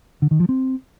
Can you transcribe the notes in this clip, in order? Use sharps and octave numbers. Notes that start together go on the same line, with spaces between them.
D3
D#3
F3
C4